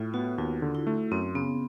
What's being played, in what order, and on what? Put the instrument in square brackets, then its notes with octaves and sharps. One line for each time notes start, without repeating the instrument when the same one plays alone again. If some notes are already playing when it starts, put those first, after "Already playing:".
Already playing: [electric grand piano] A2 [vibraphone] F4
[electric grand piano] B3 [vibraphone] F#4
[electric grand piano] D#2 [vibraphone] F4
[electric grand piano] D3
[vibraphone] E4
[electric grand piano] A3
[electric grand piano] F#2 [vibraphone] C4
[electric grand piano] C#3 [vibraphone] B3